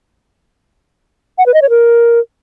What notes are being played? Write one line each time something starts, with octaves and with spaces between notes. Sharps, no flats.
F#5
B4
D#5
C#5
A#4